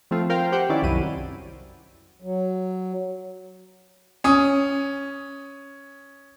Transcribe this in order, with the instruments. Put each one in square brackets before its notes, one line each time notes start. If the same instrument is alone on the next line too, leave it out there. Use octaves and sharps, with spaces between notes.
[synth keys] F3 A3 C4 F4
F4 A#4 C5 F5 G5
G4 C5 F#5 G5
D#3 C#4 E4 D5
C2 F#2 F#3 E4 D#7
[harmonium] F#3
[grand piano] C#4 D#6